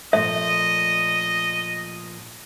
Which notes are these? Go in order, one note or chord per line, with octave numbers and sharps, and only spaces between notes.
A#2 F3 A3 D#5 E5